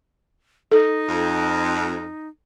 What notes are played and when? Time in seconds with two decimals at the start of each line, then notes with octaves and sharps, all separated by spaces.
0.72 D#4 A4
1.07 F2